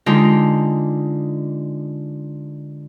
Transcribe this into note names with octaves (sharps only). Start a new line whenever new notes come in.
D3 G#3 D#4 F4 G4